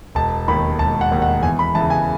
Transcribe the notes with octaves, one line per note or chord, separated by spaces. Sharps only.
E1 A5
D#2 D#3 B5
E1 A5
F#5
D#2 D#3
F#5
E2 G#5
B5
C#3 E3 A5
G#5